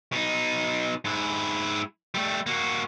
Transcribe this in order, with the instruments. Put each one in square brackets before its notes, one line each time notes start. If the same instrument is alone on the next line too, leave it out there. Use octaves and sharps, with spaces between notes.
[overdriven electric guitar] B2 D#4
G#2 E4
G3 A3
A#3 F#4